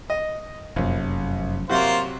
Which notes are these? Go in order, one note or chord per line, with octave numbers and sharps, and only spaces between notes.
D#5
F1 A#1 F#2
C3 F#3 A#3 F4 F#4 C5